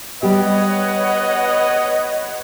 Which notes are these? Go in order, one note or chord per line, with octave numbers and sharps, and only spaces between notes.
G3 B3 G4 B4 C#5 D#5 F#5